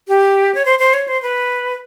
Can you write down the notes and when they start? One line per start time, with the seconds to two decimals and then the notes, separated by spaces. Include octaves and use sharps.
0.08 G4
0.55 C#5
0.65 C5
0.79 C5
0.94 C#5
1.08 C5
1.22 B4